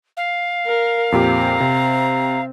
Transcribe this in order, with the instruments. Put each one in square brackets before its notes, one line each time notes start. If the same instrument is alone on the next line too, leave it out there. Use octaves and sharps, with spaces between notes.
[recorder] F5
[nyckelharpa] A#4
[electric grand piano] F2 A#2 G4 [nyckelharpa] C4 [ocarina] A#5
[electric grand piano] C3